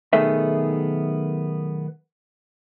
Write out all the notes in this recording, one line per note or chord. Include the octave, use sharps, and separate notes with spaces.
B1 D#3 A3 B3 G#4 E5